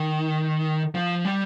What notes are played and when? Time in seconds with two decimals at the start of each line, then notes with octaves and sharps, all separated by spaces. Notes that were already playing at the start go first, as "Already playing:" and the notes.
Already playing: D#3
0.95 F3
1.25 G3